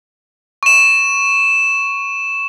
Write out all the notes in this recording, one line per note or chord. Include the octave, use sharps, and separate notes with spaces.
C#6 E7